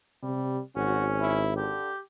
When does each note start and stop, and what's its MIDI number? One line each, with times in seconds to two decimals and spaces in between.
0.23 0.60 48
0.23 0.60 55
0.76 1.75 32
0.76 1.45 61
0.76 1.05 66
1.20 1.55 64
1.57 1.91 50
1.57 2.00 67